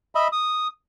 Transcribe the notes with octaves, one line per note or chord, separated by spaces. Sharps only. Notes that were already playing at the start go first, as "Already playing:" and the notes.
D#5 E5 B5
D#6